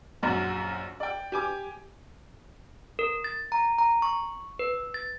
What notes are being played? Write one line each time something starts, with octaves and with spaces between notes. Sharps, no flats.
A#1 F#2 F#4 D5
D5 G5
G4 G#5 D6
A#4
A6
A#5
A#5
C#6
B4
A6